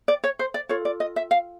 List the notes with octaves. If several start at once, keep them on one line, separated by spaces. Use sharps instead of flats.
D5
C#5
C5
D5
F4 A4 C#5
D5
D#5
E5
F5